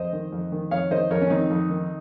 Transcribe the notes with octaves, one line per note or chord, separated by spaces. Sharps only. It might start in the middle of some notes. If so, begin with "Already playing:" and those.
Already playing: F2 C5 D#5
D#3
F2
D#3
F2 C#5 F5
D#3 C5 D#5
F2 A#4 C#5
C#4
D#3 C4 D#4
F2
D#3